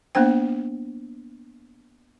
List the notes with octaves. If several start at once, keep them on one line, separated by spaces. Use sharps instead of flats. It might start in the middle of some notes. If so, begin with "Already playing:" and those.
A#3 B3 D4 C5 G5